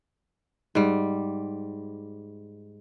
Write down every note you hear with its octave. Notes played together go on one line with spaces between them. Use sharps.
G#2 G3